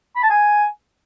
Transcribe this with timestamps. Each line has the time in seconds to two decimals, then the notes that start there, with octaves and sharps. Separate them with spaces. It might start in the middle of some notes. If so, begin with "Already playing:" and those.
0.16 B5
0.23 A5
0.30 G#5